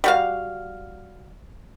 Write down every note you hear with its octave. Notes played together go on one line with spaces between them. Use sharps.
G3 F#4 F5